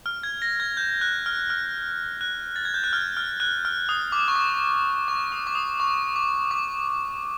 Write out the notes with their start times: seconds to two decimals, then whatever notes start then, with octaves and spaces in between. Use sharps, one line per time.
0.06 F6
0.23 G#6
0.42 A#6
0.60 G#6
0.77 G6
1.01 F#6
1.26 F6
1.50 F6
2.21 F#6
2.56 A6
2.65 G#6
2.74 G6
2.84 F#6
2.93 F6
3.17 F6
3.40 F#6
3.65 F6
3.89 D#6
4.12 D6
4.28 C#6
4.36 D6
5.08 C#6
5.32 D#6
5.47 D6
5.55 D#6
5.80 C#6
6.16 D6
6.51 D6